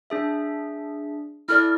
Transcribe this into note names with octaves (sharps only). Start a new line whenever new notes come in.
D4 G#4 E5
E4 A4 D5 F6